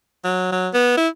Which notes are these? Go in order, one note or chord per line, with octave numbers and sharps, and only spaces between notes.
F#3
F#3
B3
E4